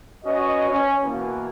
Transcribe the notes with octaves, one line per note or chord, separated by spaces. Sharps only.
C#4 F#4 B4 C#5 D#5
C#4
B2 E3 A#3